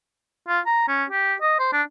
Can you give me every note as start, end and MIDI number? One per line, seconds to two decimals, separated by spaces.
0.48 0.60 65
0.66 0.84 82
0.88 1.04 61
1.09 1.34 67
1.42 1.57 75
1.59 1.73 72
1.73 1.82 62